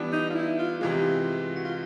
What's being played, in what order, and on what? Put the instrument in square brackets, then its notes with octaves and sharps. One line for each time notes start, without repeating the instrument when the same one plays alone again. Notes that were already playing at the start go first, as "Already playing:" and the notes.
Already playing: [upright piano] E3 G3 B3 D4
[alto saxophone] D#4
F4
E4
F4
[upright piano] C3 E3 G#3 [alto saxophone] F4
[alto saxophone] F#4
F4